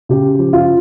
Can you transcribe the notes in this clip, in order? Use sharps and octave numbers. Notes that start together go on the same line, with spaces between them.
C#3 G4
F3
F4